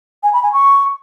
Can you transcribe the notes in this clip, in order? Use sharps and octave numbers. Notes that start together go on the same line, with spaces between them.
G#5
B5
G#5
C#6